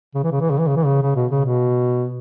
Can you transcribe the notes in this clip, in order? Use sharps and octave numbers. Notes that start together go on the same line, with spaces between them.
C#3
E3
C#3
E3
C#3
E3
C#3
E3
C#3
C#3
B2
C#3
B2